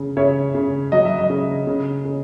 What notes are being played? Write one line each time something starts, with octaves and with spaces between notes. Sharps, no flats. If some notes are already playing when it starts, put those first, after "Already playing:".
Already playing: C#3
C#3 C#5 E5
C#3
F#3 D#5
E5
D#5
C#3
C#3
C#3